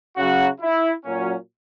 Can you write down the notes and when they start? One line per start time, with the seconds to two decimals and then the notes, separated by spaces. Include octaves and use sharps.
0.17 C#3 F#3 F#4
0.61 E4
1.04 A#2 F#3 C#4